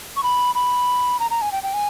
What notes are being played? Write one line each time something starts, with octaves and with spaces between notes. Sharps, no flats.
C#6
B5
B5
A#5
A#5
G#5
G5
G5
G#5